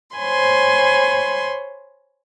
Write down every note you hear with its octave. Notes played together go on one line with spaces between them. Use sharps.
C5 C#5 G#5 B5 C6